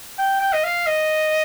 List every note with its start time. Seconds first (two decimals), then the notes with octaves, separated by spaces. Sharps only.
0.18 G5
0.41 G5
0.53 D#5
0.64 F5
0.86 D#5